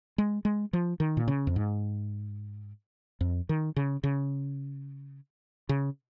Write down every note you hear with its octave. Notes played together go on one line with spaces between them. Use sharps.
G#3
G#3
F3
D#3
A#2
C#3
F2
G#2
F2
D#3
C#3
C#3
C#3